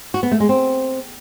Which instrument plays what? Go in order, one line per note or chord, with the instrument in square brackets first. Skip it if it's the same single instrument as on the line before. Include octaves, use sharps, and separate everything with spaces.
[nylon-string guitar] F#4
B3
A3
G#3
C4